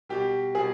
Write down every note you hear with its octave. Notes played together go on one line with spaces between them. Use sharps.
B2 G3 G4
B2 G3 G#4